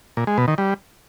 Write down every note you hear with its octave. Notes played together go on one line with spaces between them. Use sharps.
A#2
G#3
B2
D#3
G3